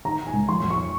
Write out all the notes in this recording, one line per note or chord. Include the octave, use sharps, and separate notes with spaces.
D#3 A#5
D#3
G#5
C#2
F3 C6
F2
C#6